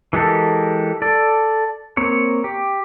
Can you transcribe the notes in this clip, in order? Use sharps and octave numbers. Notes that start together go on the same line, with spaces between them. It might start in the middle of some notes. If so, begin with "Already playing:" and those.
E3 G#3 G4 A4 A#4
A4 D5
A#3 C4 C#5
G4